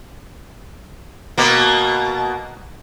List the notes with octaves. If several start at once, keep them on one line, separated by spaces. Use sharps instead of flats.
B2 A#3